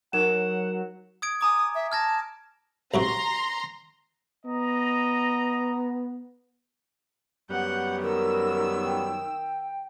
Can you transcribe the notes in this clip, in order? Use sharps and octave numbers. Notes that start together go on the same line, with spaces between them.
F#3 D#4 A#4 F#5 E7
D#6 G#6 D7
G#5 A#5 D6 D#6
E5
A5 F6 G#6 A#6
B1 C3 F#4 A#5 C6
B3 D#5 A#5
F#2 G3 B3 F#5 G6
D#3 A#4 E6
G5